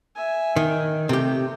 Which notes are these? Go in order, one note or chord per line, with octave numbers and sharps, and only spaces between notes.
E5 G#5
D#3
C3 A3 G4